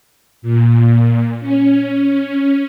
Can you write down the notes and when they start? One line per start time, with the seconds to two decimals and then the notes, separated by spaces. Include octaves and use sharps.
0.42 A#2
1.40 C#4